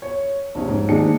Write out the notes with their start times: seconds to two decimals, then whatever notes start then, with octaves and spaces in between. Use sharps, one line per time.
0.02 C#5
0.55 A#1 C3 C#4
0.68 G#2
0.89 D#2 F3 D4 D#4 G#4 C#7